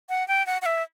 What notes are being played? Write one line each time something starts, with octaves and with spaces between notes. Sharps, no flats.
F#5
G5
F#5
F#5
E5